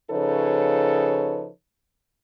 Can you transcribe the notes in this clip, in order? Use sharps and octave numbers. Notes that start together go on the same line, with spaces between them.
C#3 F3 D#4 A4 B4 C#5